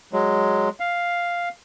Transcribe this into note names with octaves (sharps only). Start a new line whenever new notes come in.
F#3 G#3
F5